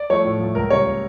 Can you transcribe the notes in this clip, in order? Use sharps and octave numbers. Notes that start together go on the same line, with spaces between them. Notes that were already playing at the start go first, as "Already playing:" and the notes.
Already playing: D5
F3 A3 C#5
A2
F3 A3
C#2 A#4
C#3 G3 A#3 C#5